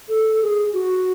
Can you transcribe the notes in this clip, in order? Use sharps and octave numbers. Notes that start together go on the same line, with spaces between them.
A4
A4
G#4
F#4